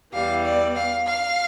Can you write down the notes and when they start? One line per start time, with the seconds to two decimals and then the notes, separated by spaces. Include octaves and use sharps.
0.13 E2 E3 G3 F5
0.44 D5
0.75 F5
1.06 F5